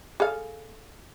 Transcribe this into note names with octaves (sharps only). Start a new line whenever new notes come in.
G#4 A4 F5